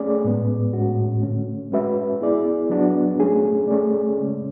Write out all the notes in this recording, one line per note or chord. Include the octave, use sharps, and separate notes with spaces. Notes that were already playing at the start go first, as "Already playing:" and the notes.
Already playing: A3 C#4 G#4 D5
A2 G#3 B3
A2 G#3 C#4 F#4
D3 A3 C#4
G#3 C#4 F#4 B4 E5
B3 E4 G#4 D5
F#3 B3 D4 F#4
A3 C#4 G#4
A3 C#4 G#4 D5
C#3 G#3 C#4